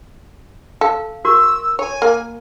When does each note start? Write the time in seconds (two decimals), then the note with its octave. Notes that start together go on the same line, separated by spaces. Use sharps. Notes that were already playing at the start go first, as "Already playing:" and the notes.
0.81 A4 F5
1.25 F#4 A#4 C#6 E6
1.79 C#5 G#5
2.02 A#3